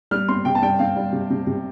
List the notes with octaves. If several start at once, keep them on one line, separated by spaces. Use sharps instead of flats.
G3 F6
C4 C6
C3 G5
A5
G3 G5
C4 F5
G3
C3
C3
C3